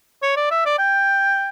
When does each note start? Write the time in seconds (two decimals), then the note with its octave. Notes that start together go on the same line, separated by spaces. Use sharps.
0.22 C#5
0.36 D5
0.51 E5
0.65 D5
0.78 G5